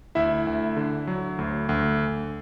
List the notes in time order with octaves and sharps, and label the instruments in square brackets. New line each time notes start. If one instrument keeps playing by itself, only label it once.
[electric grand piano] D2 E4 E5
D2
D3
F#3
D2
D2